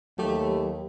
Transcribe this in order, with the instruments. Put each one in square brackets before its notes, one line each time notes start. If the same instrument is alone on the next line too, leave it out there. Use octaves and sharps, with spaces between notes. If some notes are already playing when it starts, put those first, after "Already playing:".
[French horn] D#2 [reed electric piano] F#3 G4 [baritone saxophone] A3